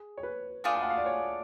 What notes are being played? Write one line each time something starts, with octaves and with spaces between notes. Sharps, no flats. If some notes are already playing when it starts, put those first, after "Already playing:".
Already playing: G#4
C#5
B4
A3 D4 F4 G#4
G#5
F#5
F5
D5
C#5